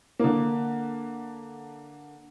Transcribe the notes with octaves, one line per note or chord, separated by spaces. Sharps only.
D3 A#3